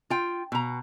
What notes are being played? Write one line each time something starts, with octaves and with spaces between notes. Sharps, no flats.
F4 G5
B2 A#5